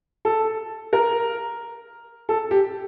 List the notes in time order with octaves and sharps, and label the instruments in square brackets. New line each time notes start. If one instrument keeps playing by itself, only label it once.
[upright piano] A4
A#4
A4
G4